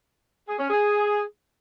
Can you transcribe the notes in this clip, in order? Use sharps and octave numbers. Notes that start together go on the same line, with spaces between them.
G#4
C#4
G#4